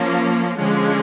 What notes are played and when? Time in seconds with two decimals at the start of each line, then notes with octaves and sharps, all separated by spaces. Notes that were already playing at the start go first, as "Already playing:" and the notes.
Already playing: F3 A#3 C#4
0.57 D3 F3 G#3 C#4